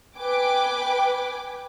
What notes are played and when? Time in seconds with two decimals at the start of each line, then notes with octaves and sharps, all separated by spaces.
0.17 B4 G5 G#5 D6